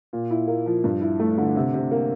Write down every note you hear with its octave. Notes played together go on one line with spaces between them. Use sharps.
A#2
E4
A#3
F3
G2
E4
A3
D3
C3
C3
A#3